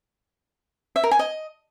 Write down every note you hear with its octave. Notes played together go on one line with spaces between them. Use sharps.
E5
A#4
G#5
D#5